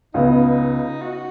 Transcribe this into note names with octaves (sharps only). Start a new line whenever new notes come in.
C#2 C#3 B3 D#4
F#4